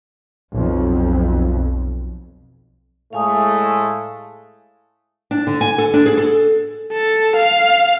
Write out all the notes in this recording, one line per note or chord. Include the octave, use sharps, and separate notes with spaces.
B1 F2
A2 G#3 A3 F5 G#5 D#6
D4
D3
G#5
A4
D4
G#4
A4
A4
F5